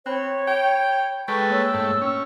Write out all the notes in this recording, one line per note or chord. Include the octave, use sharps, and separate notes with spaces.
C4 C#5 B5 F#6
G5
G#3 A4 B4 G5 C#6
A#3 C#5 E6
G#2 A3
C#4